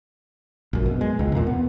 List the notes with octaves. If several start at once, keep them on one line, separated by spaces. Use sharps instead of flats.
A#1 F#2
B2
G#3
C#2
E2 A#2
B3